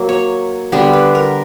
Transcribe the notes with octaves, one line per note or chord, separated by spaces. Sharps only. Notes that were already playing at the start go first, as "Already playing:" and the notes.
Already playing: F#3 A#3
C#5
D3 G3 B3 D4 B4
B4
A#4